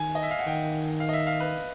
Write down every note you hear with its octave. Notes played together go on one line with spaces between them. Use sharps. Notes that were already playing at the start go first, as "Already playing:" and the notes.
Already playing: D#3 G#5
D#5
E5
F5
F#5
D#3 G5
F5
D#5
E5
F5
B4